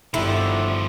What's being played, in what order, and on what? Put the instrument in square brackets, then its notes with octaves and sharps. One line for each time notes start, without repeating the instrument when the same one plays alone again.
[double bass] G1 [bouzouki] D3 E4 [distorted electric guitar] D#3 F3